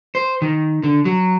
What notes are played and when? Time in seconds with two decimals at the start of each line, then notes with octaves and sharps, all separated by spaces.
0.15 C5
0.42 D#3
0.83 D3
1.05 F#3